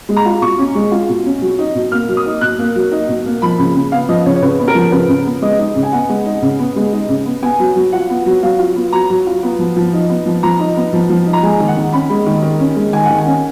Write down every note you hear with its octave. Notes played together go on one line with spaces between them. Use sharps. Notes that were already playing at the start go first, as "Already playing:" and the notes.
G#3
A#5
F4
B2 C#6
C#4
G#3
F4
B2
C#4
F#3
D#4
B2
A#3 F6
F#3
D#6
D#4
B2 F#6
A#3
F#3
D#4
B2
A#3
F3 B5
C#3
C#3
B3 F5
F3 D#5
C#3 C#5
C#5
C#3 B4
B3
A#4
F3
C#3 B4
C#3
B3
G#3 D#5
D#4
C#3
G#5
B3 F#5
G#3
D#4
C#3
B3
G#3
D#4
C#3
B3
B3 G#5
F#3
F#3
F4 F#5
B3
F#3
F#3 F5
F4
B3
F#3 A#5
F#3
F4
B3
F3
F3
D#4
B3
F3
F3 A#5
D#4
B3
F3
F3
D#4
A#5
G#3 G#5
D#3
F#5
D#3
C#4 B5
G#3
D#3
D#3
C#4
G#3
D#3 G#5
D#3 F#5
G#5
C#4